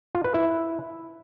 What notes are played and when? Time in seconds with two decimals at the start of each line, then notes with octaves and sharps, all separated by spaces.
0.15 F4
0.24 B4
0.34 E4